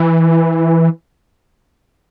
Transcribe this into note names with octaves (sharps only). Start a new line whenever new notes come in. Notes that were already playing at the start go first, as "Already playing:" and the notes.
Already playing: E3